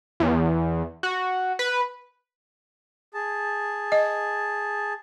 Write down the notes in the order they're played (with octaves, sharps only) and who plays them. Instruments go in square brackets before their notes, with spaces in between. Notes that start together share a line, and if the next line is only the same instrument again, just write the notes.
[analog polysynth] E2
F#4
B4
[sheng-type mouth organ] G#4 A5
[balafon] D#5